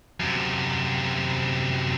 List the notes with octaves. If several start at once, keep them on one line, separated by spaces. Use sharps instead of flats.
F#2 C3